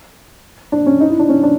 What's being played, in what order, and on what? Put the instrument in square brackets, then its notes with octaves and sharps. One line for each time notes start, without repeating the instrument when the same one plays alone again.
[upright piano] D4
C#4
D#4
E4
D4
C#4
D4